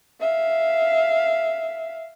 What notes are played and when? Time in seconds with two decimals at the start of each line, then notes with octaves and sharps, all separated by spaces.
0.21 E5 F5